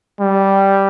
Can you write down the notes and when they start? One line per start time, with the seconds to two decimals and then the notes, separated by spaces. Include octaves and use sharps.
0.20 G3